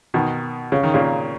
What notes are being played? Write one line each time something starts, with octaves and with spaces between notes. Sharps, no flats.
B2 D#3
C#3
D#3
A#2 C#3